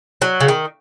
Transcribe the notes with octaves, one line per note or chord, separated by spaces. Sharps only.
F#3
C#3
D#3